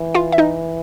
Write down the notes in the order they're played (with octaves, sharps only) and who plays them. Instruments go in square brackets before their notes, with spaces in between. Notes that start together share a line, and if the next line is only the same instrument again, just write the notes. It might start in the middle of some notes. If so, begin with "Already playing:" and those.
Already playing: [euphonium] E3
[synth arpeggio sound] F4 F5
E5
D#4 D#5